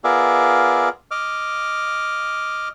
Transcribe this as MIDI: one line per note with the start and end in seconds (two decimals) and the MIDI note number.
0.04 0.89 59
0.04 0.89 65
0.04 0.89 68
0.04 0.89 70
0.04 0.89 74
0.04 0.89 76
1.11 2.69 75
1.11 2.69 86
1.11 2.69 89